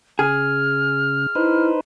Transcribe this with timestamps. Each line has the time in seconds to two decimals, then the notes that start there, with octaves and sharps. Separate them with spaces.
0.19 C#3 G#4 F6
1.35 D#4 E4 B4 C5